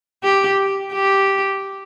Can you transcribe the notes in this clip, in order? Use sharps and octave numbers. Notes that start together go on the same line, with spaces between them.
G4
G4